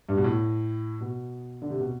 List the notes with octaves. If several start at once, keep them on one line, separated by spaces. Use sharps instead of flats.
G2
B2
A2
B2
D3
C3
B2